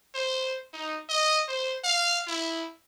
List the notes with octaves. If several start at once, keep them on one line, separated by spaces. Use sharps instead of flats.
C5
D#4
D#5
C5
F5
E4